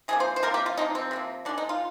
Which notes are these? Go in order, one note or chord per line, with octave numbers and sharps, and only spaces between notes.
C3 F3 A#3 G#4
C5
C5
C3 F3 A#3 A#4
G4
F4
C3 F3 A#3 D#4
C4
C3 F3 A#3
D#3 G#3 D4
D#4
F4